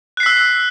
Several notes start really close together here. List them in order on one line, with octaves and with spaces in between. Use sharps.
F#6 C7 B6 E6